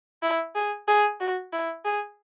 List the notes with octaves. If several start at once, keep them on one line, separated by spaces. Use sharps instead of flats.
E4
G#4
G#4
F#4
E4
G#4